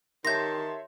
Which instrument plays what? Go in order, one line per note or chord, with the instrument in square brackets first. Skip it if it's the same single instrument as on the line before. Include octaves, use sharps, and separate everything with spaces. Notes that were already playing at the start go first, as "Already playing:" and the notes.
[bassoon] D#3 [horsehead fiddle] G4 A5 [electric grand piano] C#5 E5 C6 [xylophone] G6 A#6